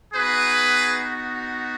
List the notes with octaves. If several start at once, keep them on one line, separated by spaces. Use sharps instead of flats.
B3 D#4 F#4 G#4 B4